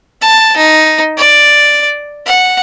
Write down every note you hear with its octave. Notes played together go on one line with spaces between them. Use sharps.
A5
D#4
D5
F#5